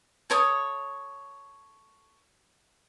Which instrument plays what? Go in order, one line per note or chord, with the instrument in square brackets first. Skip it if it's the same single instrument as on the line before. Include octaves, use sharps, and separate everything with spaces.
[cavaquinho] A4 C#5 D#6